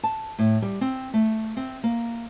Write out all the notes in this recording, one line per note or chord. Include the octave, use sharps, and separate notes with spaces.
A5
A2
G3
C4
A3
C4
A#3